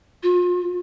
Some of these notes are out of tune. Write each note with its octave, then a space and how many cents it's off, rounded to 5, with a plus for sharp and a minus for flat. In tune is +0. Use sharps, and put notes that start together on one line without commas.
F4 +35